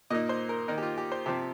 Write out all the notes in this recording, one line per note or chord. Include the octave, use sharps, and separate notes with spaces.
A#2 A#3 D#4 D#5
C5
A#4
D#3 A#3 D#4 A#4
G4
F4
G4
C5
C3 F3 C4 G4